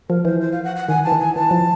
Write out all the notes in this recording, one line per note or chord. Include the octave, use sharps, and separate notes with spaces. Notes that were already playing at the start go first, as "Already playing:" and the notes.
F3 A#4
E3 C5
C5
F5
F#5
F#5
D#3 G#5
E3 A5
D#3
G#5
E3 A5
F3